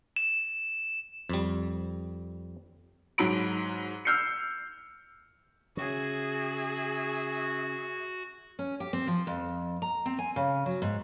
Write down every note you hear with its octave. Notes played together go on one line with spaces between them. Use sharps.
E7
F2 G3
G#2 F#3 B5 D7
E6 F6 G6 C7 C#7
C#3 F#4 G#4 E5
C#4
G4
C4
F3
F2
A#5
C4
G#5
C#3
F#3
G#2